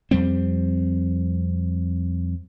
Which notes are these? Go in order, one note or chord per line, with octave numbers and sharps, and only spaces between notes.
F2 G3 C4